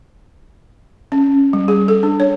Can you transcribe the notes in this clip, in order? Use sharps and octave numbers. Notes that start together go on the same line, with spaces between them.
C#4
G3
G#4
A4
D4
C#5